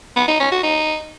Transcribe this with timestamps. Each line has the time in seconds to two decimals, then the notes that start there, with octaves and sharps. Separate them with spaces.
0.17 B3
0.28 D#4
0.40 C#4
0.52 F#4
0.64 D#4